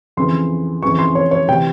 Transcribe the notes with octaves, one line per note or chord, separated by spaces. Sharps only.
F2 C#3 E3 C6
F2 C#3 E3 C#6
C6
C#5
C#5
C3 E3 G5